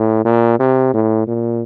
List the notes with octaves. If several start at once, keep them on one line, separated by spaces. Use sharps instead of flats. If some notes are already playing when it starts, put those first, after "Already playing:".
Already playing: A2
A#2
C3
A2
A#2